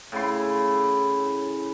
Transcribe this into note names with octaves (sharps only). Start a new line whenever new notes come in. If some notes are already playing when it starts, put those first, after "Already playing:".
A2 C#3 E4 C6